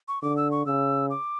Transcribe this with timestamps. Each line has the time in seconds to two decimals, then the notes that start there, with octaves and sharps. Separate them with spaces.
0.08 C#6
0.22 D3 D6
0.37 E6
0.51 C#6
0.66 C#3 E6
1.10 D6